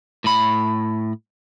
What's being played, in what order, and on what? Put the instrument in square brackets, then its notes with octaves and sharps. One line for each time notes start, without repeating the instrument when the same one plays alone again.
[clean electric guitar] A2 B5